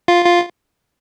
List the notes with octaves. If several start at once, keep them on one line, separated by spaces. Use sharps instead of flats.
F4
F4